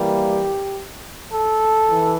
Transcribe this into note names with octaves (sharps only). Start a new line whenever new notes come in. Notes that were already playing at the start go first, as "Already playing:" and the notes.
Already playing: E3 G3 A#3 G4
A4
E3